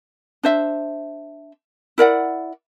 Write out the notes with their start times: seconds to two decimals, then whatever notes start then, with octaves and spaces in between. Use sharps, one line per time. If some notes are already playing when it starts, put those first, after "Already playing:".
0.43 D4 C5 E5
1.98 E4 A#4 D5 F#5